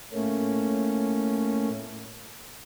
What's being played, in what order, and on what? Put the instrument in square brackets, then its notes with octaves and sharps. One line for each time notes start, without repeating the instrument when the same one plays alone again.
[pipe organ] A2 A3 A#3 C#4